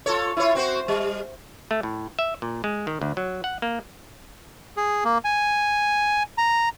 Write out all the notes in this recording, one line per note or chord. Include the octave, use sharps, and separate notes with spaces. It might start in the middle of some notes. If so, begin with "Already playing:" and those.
F4 A4 C#5
E4 F4 C#5
C4 F#4 C5
G3
A3
A2
E5
A#2
G#3
D#3
D2
F#3
F#5
A#3
G#4
A#3
G#5
A#5